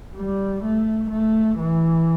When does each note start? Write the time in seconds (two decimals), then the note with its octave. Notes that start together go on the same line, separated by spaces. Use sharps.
0.16 G3
0.63 A3
1.11 A3
1.58 E3